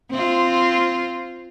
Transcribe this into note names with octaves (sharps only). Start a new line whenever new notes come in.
C4 F4